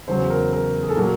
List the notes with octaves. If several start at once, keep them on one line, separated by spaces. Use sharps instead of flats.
E2 C#3 F#3 C5
A#4
A#4
G#4
A4
A#2 F#3 A#4